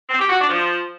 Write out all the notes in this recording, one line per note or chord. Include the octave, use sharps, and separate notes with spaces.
C4
G4
F#4
D4
F3